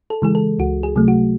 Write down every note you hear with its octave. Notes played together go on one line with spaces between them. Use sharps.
A4
C#3 E3 G#3 G#4
A4
C#2 F#4
G#4
C3 F#3 A3
F#4